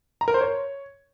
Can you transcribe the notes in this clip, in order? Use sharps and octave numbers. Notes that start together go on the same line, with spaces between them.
A#5
A#4
C5
C#5